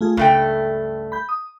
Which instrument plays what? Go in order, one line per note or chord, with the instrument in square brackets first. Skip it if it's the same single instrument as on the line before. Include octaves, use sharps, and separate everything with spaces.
[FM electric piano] A3 F4 G#4
[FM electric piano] C#2 [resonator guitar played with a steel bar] G2 A3 G5
[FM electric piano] B5 G6
D#6